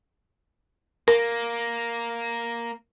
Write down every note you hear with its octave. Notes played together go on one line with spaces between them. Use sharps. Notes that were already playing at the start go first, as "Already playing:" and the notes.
A#3 A#4